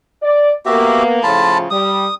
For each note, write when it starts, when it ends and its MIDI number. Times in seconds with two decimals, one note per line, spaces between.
0.23 0.50 74
0.66 1.20 58
0.66 1.20 59
0.66 1.03 66
0.66 1.03 67
0.66 1.03 76
1.23 1.65 45
1.23 1.65 49
1.23 1.65 53
1.23 1.58 65
1.23 1.58 81
1.23 1.58 83
1.71 2.07 55
1.71 2.14 87